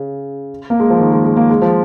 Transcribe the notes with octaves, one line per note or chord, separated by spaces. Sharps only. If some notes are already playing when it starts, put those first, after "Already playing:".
Already playing: C#3
A#3
G#3
F3
D#3
G#3
G#3
A#3
G#3
F3